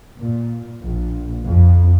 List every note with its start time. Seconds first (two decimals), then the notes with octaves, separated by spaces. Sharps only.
0.17 A#2
0.81 A#1
1.43 F2